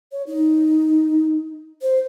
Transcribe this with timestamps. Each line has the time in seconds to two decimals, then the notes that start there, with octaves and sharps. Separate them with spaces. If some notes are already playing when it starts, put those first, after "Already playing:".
0.12 C#5
0.27 D#4
1.82 C5